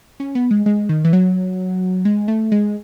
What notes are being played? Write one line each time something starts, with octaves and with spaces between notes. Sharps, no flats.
C#4
B3
G#3
G#3
D#3
E3
F#3
G#3
A3
G#3